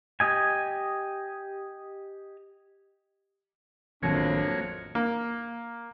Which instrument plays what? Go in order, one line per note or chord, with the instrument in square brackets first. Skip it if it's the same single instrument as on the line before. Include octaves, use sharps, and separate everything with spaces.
[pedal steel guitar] G4 D#5 G#5
[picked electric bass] A1 D#3 F3 [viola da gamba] F2 [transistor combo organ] F#3 A#3 C#5 [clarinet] D4
[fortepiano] A#3